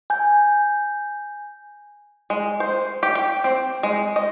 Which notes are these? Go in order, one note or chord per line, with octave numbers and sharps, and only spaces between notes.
G#5 G6
G#3
C5
G4
G4
C4
G#3
D#5